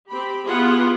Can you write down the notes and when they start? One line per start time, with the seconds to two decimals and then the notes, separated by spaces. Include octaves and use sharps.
0.10 C4 G4 B5
0.45 B3 E4 F4 G4 G#4 F#5